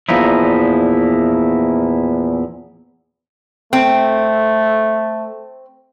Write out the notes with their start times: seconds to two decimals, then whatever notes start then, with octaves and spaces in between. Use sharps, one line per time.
0.09 E2 A#2 F3 D#4 E4
3.73 A3 C4